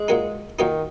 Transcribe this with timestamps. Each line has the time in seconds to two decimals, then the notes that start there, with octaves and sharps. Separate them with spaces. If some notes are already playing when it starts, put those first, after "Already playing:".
Already playing: G#3
0.08 A#2 F#3 A#3 D#4
0.59 A#2 D#3 F#3 A#3 D#4